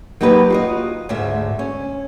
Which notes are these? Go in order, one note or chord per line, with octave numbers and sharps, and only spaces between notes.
F#3 A#3 D#4 G4 B4
F4 F#4 D#5
D2 G#2 E5
C#4